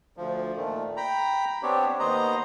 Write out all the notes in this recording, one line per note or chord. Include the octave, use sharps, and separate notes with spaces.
D2 F3
A#2 D#3 A3
G5 A#5 B5
B3 C4 D4 G4 C#5
D#2 B3 C5 D#5 A#5